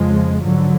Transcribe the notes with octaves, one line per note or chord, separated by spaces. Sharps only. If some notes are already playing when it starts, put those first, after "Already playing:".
Already playing: F2 C#3 F3 G#3
G#2 D3 F#3